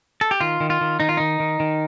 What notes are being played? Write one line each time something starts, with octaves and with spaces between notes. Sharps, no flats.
A4
G4
D#3 F4
D#3
F4
D#3
D#3 D#4
F4
D#3 D#4
D#3
D#3